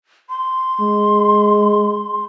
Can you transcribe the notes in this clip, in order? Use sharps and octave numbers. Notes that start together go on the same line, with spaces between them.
C6
G#3